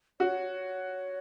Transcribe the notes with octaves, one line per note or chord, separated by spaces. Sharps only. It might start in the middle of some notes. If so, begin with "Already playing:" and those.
F#4 C#5